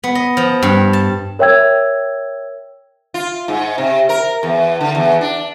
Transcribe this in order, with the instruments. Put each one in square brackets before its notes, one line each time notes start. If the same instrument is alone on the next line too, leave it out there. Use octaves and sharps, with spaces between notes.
[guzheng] B3
D#5
F3
G2
A5
[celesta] A#4 C#5 E5 G5 E6 G#6
[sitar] F4
G#2
C3
A#4
E2
D3
E2
D4